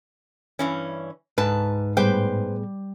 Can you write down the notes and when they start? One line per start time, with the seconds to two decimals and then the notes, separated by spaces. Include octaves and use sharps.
0.59 G2 E3 C#4
1.38 C#2 G#2 B4 A5
1.97 A2 G3 B3 G#4 B4 C5 G5